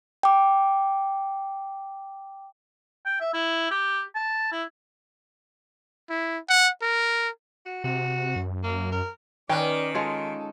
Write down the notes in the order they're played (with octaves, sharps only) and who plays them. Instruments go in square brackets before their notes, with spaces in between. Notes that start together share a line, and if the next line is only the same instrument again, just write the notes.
[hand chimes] G5 D6
[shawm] G5
E5
E4
G4
A5
E4
[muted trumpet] E4
F#5
A#4
[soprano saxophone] F#4
[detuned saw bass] C3 [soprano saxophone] F#4
[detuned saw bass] F#2
[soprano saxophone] A#3
A#4
[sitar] D#3 [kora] C#4 [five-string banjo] B4 G5 [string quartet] D5
[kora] G#3 F4 C#5 [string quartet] A4